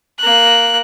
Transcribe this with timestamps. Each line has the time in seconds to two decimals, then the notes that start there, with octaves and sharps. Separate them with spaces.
0.19 A#3 F#6